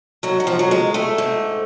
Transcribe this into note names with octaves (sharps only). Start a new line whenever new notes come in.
G#2 F#3
F#3
F3
F#3
G#3
A3
G#2